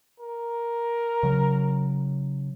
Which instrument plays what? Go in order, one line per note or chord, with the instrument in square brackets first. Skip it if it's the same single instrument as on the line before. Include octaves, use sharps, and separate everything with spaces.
[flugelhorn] A#4
[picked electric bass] C#3 F#3